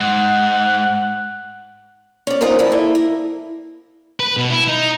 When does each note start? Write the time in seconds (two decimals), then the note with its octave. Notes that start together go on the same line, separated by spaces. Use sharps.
0.01 G#2 F#5
2.27 C#4 D5
2.41 D#4 F4 G#4 A#4 C5
2.59 A#2 F3 G3 E4
2.72 A#3 E4 A4
2.95 A#4
4.20 B4
4.37 B2
4.50 E4
4.68 D#4